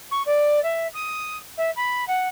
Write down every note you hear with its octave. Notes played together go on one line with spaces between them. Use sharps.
C#6
D5
E5
D#6
E5
B5
F#5